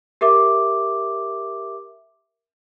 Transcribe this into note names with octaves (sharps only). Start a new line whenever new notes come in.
G4 A#4 E5 D6